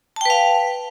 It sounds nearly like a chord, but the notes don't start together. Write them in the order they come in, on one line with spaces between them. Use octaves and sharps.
A5 G5 B4 F5